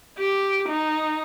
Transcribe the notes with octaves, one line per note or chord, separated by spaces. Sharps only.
G4
D#4